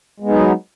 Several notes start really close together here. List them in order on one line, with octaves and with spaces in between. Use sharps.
G#3 B3 D#4 F#3